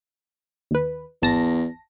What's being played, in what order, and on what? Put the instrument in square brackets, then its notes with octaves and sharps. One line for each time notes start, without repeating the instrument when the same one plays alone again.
[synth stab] D#2 B4
[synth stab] G#1 A5 A#6 [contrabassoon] E2